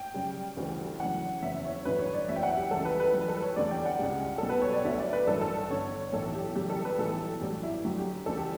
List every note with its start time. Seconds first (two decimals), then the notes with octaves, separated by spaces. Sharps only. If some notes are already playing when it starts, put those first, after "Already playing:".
Already playing: G5
0.14 F#2 C#3 G3
0.57 D2 C#3 E3 G3
1.00 F#2 C#3 E3 F#5
1.42 F#1 E2 C#3 E5
1.65 C#5
1.85 A1 G2 D3 F#3 B4
1.99 C#5
2.14 D5
2.28 F#1 E2 C#3 F#3 E5
2.36 G5
2.43 F#5
2.57 G4
2.71 C#2 C#3 E3 G3 A4
2.85 B4
3.00 B4
3.14 F#2 E3 G3 B4
3.28 A4
3.37 B4
3.43 C#5
3.56 E2 D3 G3 D5
3.71 G5
3.86 F#5
3.99 C#2 C#3 G3
4.38 B1 B2 G3 A4
4.50 B4
4.62 C#5
4.73 D5
4.84 D2 D3 F#3 E5
4.99 D5
5.13 B4
5.27 A1 G2 F#3 A4
5.41 A4
5.70 G1 G2 D3 C#5
6.12 B1 A2 E3 A4
6.35 G4
6.55 F#2 C#3 E3 G3 G4
6.70 A4
6.85 B4
6.98 B1 A2 E3 G3 A4
7.41 A1 G2 F#3 G4
7.63 E4
7.85 F#2 D3 F#3
7.98 G4
8.26 D2 C#3 E3 G3 A4
8.37 G4